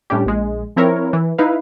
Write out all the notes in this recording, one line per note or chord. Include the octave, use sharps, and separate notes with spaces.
A2 G3 C#4 D4 G4
A#1 G#3
F3 C4 E4 A#4 C#5
E3
D#4 E4 B4 F5